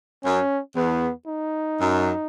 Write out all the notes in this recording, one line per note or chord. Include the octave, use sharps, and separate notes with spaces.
F#2 C#4
E2 B3
D#4
F#2